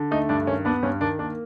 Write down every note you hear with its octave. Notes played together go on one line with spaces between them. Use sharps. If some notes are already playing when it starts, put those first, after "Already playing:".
Already playing: D3
A3 D#4
G2 D4
D#3 C#4
B3 D4
G2 C#4
D#3 D4
A#3 D4